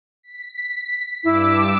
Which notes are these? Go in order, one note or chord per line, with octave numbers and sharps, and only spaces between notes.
B6
G2 E4 D6 E6